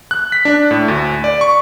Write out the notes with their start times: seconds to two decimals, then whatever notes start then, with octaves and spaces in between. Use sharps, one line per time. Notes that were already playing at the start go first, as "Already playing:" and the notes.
0.11 F#6
0.32 B6
0.45 D4
0.71 A2
0.88 D2
1.24 D5
1.41 C#6